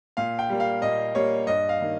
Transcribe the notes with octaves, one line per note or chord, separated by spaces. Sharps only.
A#2 F5
G5
G3 A#3
F5
A#2 D#5
G3 A#3 C#5
G2 D#5
F5
D#3 A#3